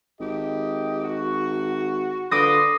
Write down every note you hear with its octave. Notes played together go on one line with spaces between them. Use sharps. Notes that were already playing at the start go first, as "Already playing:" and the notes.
G#1 G4 D#5
F#4
D3 F4 B4 C6 D6 D#6 A#6